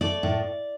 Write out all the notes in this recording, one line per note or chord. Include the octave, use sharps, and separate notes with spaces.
A3 D5
A2